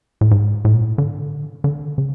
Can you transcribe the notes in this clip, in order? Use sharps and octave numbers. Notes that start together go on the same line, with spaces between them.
A2
G#2
A2
A#2
A2
D3
D3
C#3